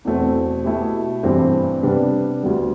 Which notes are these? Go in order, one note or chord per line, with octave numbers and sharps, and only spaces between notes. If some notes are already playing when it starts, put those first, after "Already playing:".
E2 B2 A3 C4
B2 A3 E4 G4
G2 E3 A3 C4 G4
C3 G3 B3 D4
D2 D3 G3 B3